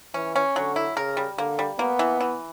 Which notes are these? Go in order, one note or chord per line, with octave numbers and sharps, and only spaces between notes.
E3 C#4
C#4
D3 F#3
E4
C#3 A#4
G3
D3 A#3
G3
A#3 B3
E3
E3